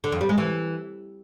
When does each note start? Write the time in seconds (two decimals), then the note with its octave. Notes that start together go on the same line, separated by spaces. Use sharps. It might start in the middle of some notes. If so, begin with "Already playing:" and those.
0.04 D3
0.12 F2
0.21 G3
0.29 G#3
0.38 E3